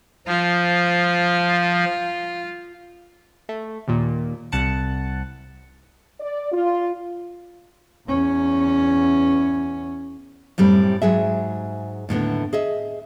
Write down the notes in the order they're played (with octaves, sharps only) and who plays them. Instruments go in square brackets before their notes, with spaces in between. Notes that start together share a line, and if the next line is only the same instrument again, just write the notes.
[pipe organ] F3 [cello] F4
[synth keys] A3
D#2 A#2
C2 F#5 A5 C#7
[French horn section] D5
F4
[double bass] E2 C#4
[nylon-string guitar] F#2 A2 G3 C4
G#2 F#3 G#4 E5
D#2 A2 D3 B3
G#4 D#5 E5